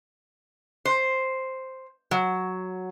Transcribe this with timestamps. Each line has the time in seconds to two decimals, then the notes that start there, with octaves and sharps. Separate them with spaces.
0.85 C5
2.11 F#3